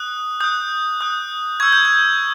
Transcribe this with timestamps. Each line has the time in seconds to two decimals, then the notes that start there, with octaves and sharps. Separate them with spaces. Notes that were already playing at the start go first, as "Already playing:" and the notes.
Already playing: D#6 F#6
0.40 D#6 F#6 G6
1.01 D#6 F#6
1.60 C#6 E6 G6 G#6
1.73 G6
1.85 G#6